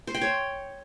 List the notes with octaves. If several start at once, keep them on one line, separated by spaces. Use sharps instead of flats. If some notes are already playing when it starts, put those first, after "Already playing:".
C5
G5
C#5